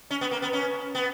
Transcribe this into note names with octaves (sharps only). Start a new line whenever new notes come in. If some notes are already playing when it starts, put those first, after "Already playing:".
C#4
B3
A#3
B3
C#4
B3